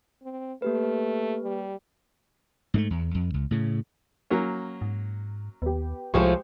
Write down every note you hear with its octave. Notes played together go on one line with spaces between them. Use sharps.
C4
A3 A#3 G4 B4
G3
G#2 G#3 A3
E2
F2
C#2
A2 C#3
F#3 A#3 C#4
G#2
D#2 B3 G4
C2 A2 F3 G#3 A3 G4 C5 C#6